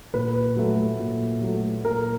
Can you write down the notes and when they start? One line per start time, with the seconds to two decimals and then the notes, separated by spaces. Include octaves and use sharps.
0.14 A#2 B4
0.56 F#3 A3
0.99 A#2
1.42 F#3 A3
1.84 A#2 A#4